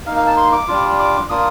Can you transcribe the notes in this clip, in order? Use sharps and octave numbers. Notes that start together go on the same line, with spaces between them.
A#3 D#4 F5
F5
A5
C6
D6
G3 D4 F4
D6
A#3 D4 F4 D#6